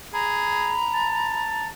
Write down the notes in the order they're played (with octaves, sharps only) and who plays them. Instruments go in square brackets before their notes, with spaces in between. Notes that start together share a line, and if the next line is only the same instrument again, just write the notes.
[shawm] G#4 [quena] A#5 [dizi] B5
[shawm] A5